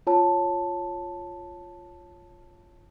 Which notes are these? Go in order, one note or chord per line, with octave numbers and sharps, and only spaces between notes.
F4 C#5 A5